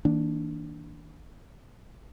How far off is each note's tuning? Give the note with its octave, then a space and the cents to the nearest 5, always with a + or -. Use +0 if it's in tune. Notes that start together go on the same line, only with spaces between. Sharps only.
D#3 +45 A#3 +0 D4 +0